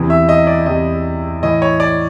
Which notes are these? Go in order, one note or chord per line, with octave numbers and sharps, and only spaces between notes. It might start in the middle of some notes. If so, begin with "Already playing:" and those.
Already playing: E2 C3 E3
E5
D#5
D5
E2 C3 E3 D#5
A2 E3 D#5
C#5
D5